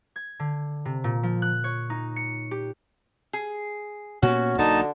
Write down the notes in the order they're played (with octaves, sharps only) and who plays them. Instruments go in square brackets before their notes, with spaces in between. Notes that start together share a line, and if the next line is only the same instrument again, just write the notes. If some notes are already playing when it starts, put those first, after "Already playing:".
[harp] G#6
D3
C3
A#2
F3
F#6
C#5
D#4
C#7
G4
[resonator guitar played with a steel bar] G#4
[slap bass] A#2 A#3 B3 [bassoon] C#4 [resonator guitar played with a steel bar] F#4
[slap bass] B1 A#3 [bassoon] D3 [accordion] D#4 A5